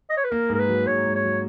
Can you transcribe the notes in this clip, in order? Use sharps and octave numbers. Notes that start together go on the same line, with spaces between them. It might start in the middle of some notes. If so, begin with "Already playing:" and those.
D#5
C#5
B4
A#3 A#4
G#2 A#4
B4
F#3
G#2 C#5
G#2
C#5
F#3